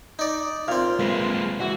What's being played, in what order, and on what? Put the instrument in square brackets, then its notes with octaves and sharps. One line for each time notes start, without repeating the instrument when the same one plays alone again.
[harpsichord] D#4 D5
[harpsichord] A#2 C4 [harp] F5
[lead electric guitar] G#3 A#3 [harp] B4
[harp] E3 [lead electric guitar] F#4